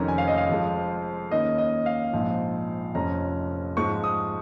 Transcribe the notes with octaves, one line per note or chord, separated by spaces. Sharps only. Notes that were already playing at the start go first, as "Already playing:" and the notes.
Already playing: F1 F2 D#3 C#4 A#5
G#5
F5
D#5
F5
F2 F3 G#3
D#2 D#3 C#4 D#5
D#5
F5
A#1 G#2 F3
F1 F2 F3 C#4 A#5
G#2 F3 G#3 C#6
D#6